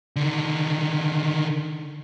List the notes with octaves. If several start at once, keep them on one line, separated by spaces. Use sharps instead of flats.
D3 D#3